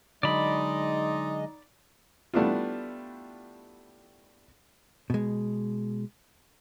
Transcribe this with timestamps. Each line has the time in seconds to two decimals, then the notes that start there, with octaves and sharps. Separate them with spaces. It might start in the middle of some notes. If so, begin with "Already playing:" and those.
0.23 D3 F#3 G#3 D#4 D5 D#5 B5
2.34 G3 A3 B3 D4 E4 F4
5.10 B2 G#3